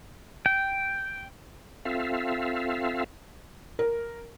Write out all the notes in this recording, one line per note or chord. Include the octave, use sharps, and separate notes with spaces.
G5
C4 F4 A4 E5 F5
A#4